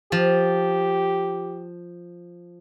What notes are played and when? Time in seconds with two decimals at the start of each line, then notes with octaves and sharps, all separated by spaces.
0.12 F3 G4